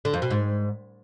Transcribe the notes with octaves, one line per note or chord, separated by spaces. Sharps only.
D3
F2
B2
G#2